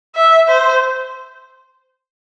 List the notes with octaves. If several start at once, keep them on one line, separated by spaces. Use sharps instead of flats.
E5
C5